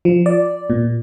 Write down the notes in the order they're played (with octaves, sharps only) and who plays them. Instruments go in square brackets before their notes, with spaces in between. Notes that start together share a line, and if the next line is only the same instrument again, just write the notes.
[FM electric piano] F3
D5
A#2